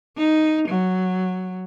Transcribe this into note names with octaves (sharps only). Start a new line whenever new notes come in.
D#4
F#3